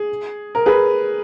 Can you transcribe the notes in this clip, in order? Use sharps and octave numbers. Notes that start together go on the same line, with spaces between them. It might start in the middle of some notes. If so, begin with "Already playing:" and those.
Already playing: G#4
A#4
G#4 B4